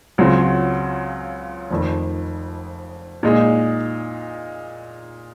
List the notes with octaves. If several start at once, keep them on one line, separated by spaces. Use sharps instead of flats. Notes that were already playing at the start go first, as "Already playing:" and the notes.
C#2 C#3 F#3 C4 F4
F1 F2 D#3
A#2 G#3 D#4